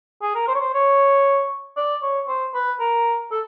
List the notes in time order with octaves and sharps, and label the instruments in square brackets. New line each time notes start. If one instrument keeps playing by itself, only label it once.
[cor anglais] G#4
A#4
C5
C#5
C5
C#5
D5
C#5
C5
B4
A#4
A4